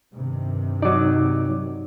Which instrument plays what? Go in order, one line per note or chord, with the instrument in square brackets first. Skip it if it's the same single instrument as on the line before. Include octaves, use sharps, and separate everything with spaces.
[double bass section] G2 C3 D#3
[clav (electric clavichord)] F#3 D5 [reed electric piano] D#4 D6